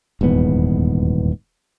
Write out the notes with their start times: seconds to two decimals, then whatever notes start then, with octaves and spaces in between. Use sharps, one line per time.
0.21 D#1 E2 G#2 B3